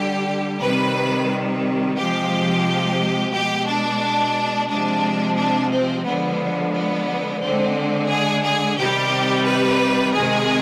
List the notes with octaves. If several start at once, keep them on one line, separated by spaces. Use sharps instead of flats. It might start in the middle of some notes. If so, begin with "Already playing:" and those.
Already playing: D3 G3 G4
C3 D#3 G3 B4
C3 F3 G#3 G4
B2 G#3 G4
D4
C3 F3 G#3 D4
D4
C4
D3 F3 G#3 B3
B3
D3 G#3 C4
G#4
G#4
C3 D#3 G3 G4
B4
C3 D#3 G#3 G#4